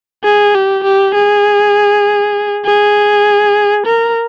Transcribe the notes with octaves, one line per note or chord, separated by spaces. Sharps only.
G#4
G4
G4
G#4
G#4
A#4